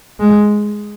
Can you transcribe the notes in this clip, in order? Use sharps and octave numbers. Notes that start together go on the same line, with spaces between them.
G#3